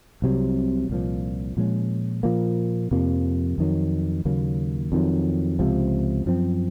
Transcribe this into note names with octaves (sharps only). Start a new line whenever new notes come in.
C2 C3 F#3
C2 A#2 F3
A#2 F3 G#3 C#4
A#2 F3 A#3
F2 C3 F3 A#3
F2 D#3 F#3
D#2 C#3 F#3 A#3
F2 D#3 F#3
C#2 C3 F3
F#2 F3 C4